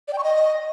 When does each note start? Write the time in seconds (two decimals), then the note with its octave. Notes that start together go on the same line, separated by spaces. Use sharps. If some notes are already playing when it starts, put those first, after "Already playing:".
0.08 D5
0.13 G5
0.18 C#6
0.23 D#5